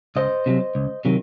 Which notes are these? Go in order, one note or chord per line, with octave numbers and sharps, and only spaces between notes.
C#2 C5 D#5
C3 D#3 F#3
C#2
C3 D#3 F#3